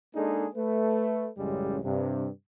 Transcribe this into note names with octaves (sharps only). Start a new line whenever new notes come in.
G#3 A#3 D4 D#4 G#4 A4
A3 B4
A1 F#2 C#3 G3 G#3
G2 C3